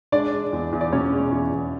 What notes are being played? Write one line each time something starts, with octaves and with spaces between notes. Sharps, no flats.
G#3 D4 D5
G#3
E2
E2
D5
B2 C#4 C#5
G#3
E2
E2